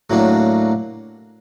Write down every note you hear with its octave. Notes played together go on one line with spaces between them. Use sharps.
A2 F#3 A#3 D4